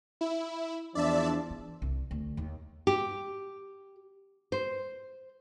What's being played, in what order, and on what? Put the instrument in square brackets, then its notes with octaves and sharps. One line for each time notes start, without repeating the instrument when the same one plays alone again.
[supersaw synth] E4
[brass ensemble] E2 F3 D4 [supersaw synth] D5 E5 A5
[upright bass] E3
C2
D2
D#2
[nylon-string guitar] G4
C5